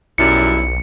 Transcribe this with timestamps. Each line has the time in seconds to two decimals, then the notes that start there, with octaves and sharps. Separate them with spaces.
0.18 B1 F#2 G3 E4 C#7